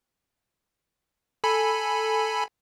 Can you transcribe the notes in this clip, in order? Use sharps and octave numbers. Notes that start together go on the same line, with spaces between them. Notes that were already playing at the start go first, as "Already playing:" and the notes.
A4 G#5 B5